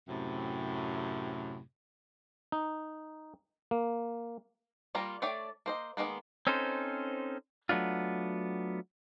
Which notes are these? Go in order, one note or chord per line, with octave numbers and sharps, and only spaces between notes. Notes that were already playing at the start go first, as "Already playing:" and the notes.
F#2 A2 C3
D#4
A#3
G3 A#3 F4 A#5
A3 D4 C#5 D5 G5
A#3 C5 D#5
D#3 F3 G#3 A#3 B3
C4 C#4 D#4 A4 C5
F#3 A3 B3 D4 F4